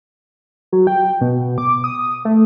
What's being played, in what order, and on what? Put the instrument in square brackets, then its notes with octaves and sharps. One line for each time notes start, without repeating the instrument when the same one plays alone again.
[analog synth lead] F#3
G5
B2
D6
D#6
A3